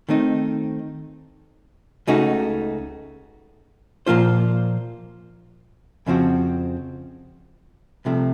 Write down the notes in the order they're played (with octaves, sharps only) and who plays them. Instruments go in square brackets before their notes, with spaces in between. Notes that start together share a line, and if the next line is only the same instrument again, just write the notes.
[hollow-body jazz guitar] D#3 A3 C4 D#4
C#2 C#3 A3 D#4 F#4
A#2 F3 A#3 F4 C5
F2 C#3 F3 C4 F#4
C2 C3 F3 A3